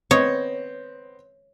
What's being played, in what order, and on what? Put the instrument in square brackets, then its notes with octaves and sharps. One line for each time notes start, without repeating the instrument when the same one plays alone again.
[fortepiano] B3 C4 D#5 [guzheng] C#5